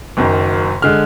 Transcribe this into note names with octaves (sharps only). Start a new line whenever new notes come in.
F#1 F#2 D#3
D3 G#3 F6